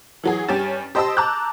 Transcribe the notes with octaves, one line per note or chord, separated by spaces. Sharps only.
E3 F#3 G#4
G2 C#4 G4 G#5 A6 E7
G4 C5 D#5 A5 B5 E6
A5 A#5 D6 E6 F#6 G6